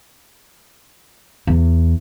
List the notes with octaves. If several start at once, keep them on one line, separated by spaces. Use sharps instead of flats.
E2